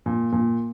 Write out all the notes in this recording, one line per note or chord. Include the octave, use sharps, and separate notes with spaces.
A#2
A#2